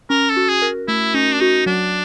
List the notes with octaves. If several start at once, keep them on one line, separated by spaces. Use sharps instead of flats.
C#4 A#4
A4
F#4
G#4
A#4
A3 E4
C#4 D#4
D4
D#4 F#4
F#3 D4